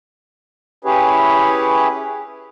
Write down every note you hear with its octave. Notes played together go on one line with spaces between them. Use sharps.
C#4 E4 G4 G#4 B4 C#5